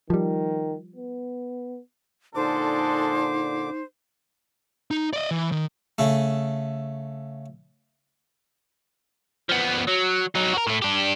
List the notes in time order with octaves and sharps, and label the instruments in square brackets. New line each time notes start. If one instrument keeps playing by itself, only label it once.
[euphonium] D#3 [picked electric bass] F3 G3
[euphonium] B3
[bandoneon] A#2 D3 D6 [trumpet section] G#3 D4 A4 [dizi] D#4 [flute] C5
[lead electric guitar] D#4
D5 D#5
E3
D#3
[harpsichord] C#3 A3
[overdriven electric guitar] F3 B3
F#3
F#3 D#4
F#4 A#4
A2 A3
D4 G4